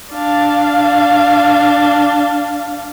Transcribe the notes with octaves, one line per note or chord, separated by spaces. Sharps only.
D4 F5